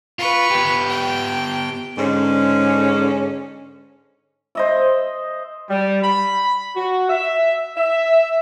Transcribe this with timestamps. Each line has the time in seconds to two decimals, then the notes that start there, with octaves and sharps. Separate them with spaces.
0.19 F4 B4 C#6
0.51 B3 G4
0.89 G5
1.98 G#2 D3 G#3 C#4
4.55 C5 D#5 E5
5.69 G3
6.03 B5
6.74 F#4
7.09 E5
7.76 E5